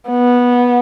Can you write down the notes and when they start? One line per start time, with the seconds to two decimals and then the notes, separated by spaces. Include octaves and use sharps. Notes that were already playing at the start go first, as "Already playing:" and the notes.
0.10 B3